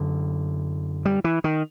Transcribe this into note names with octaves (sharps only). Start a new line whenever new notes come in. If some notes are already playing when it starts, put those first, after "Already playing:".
Already playing: F#2 D3
G3
E3
D#3